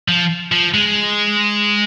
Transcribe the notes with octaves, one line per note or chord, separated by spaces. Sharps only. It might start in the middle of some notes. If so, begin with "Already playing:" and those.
F3
F3
G#3